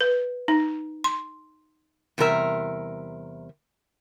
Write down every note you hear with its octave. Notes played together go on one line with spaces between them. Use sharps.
B4
D#4
C6
E2 C3 G3 A#4 E5